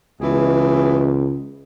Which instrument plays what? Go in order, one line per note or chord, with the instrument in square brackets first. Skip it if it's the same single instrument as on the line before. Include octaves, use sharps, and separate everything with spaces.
[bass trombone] C#2 [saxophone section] B2 E3 G#4